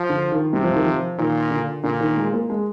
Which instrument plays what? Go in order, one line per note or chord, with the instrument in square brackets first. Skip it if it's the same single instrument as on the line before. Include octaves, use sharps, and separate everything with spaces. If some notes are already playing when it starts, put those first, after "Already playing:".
Already playing: [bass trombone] F3
[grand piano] D3
D#3
[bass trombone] C3 [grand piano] G3
[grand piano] F3
D#3
F3
[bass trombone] A#2 [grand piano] D#3
[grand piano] D3
[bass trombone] A#2 [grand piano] D3
[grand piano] D#3
G#3
A#3
G#3